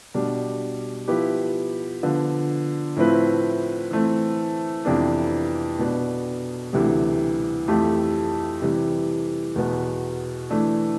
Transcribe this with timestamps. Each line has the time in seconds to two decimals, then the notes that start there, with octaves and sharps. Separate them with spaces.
0.14 B2 G3 D4
1.08 F3 B3 E4 G4
2.03 D3 F3 B3
2.96 A2 F3 C4 E4 B4
3.91 E3 A3 C4
4.85 F2 C3 E3 B3 D4
5.79 B2 B3 D4
6.73 D2 C3 E3 G3
7.68 F2 E3 A3 E4 G4
8.62 C3 E3 G3
9.55 E2 B2 B3
10.50 E3 A3 D4